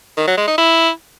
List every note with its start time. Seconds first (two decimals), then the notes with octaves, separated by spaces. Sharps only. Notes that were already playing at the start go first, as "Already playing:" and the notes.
0.17 D#3
0.27 F#3
0.38 G#3
0.48 D#4
0.58 E4